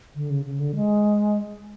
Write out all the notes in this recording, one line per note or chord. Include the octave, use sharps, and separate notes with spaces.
D3
C#3
C#3
D3
G#3